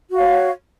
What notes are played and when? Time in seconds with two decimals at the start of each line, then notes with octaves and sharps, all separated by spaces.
0.10 F#4
0.15 F5
0.20 C#5